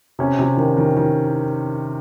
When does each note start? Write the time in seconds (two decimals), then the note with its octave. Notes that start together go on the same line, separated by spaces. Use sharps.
0.19 C3 C#4
0.39 C3
0.57 D#3
0.77 D#3
0.96 D#3